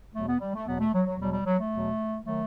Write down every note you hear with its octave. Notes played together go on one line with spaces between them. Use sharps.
E2 B2 F#3 A3
B3
G3
A3
E2 B2 F#3 B3
A3
F#3
F#3
E2 B2 F#3 G3
G3
F#3
A3
E2 B2 F#3
D#3 F#3 A3